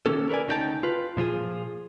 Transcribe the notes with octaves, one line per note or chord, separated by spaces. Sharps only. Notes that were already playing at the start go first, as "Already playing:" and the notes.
D#3 A#3 C#4 A4
A#4 B4 C#5 D5 G#5
D2 C#3 D#4 F4 G5 A5
F4 B4
A#2 F3 F4 G#4